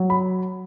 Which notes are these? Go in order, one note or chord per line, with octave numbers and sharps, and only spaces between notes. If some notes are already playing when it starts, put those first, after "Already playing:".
Already playing: F#3
B5